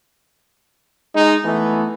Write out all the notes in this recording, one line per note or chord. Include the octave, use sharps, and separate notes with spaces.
G#3 D#4
E3 A3 B3